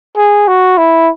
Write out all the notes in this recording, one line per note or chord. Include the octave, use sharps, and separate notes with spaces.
G#4
F#4
E4